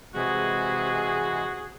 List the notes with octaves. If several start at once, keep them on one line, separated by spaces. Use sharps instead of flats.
C3 E3 G#3 F#4 G#4